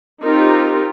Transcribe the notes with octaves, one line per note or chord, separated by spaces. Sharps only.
C4 D#4 F4 G4 A#4